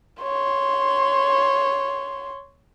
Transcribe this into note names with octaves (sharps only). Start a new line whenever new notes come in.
C#5 C6